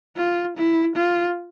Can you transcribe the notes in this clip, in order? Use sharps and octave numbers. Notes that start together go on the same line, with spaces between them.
F4
E4
F4